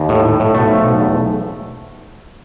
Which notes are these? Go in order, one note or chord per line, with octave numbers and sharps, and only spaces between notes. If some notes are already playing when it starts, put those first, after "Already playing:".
Already playing: D#2
A2
A2
A2
B1 A3
F3
B1
E2